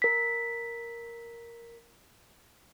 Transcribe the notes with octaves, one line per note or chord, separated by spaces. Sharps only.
A#4 B6